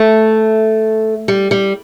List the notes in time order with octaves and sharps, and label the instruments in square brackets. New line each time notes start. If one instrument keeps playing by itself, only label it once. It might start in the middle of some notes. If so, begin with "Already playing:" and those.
Already playing: [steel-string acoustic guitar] A3
G3
G3